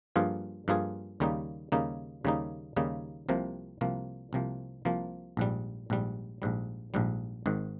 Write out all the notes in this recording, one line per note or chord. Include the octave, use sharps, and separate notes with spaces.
G2 F3 A#3 F4 G#4
G2 F3 A#3 F4 G#4
D#2 C#3 G3 A#3 D#4
D#2 C#3 G3 A#3 D#4
D#2 C#3 G3 A#3 D#4
D#2 C#3 G3 A#3 D#4
C2 C3 F3 A#3
C2 C3 F3 A#3
C2 C3 F3 A#3
C2 C3 F3 A#3
A#1 G#2 G3
A#1 G#2 G3
A#1 G#2 G3
A#1 G#2 G3
G#1 G#2 D#3